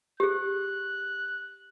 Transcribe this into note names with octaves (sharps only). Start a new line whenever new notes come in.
G4 G#4 F#6